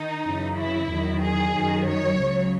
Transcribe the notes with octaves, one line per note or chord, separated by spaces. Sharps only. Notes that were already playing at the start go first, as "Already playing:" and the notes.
Already playing: D#3 D#4
F#2 C#3 E3
E4
E2 D#3 F#3
G#4
F#2 D#3 F#3
C#5
C#2 C#3 F#3